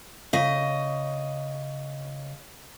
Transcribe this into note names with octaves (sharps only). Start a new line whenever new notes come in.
C#3 D#5